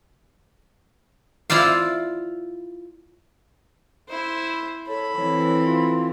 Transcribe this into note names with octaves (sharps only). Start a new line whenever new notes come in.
E4 F4 C5 D5 F5
E4 C5
A4 C#5 B5
E3 C4 C#5
F4